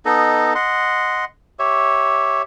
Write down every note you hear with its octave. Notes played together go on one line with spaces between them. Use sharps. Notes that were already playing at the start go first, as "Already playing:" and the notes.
B3 D#4 A4 D#5
D#5 F#5 C6
G4 C#5 E5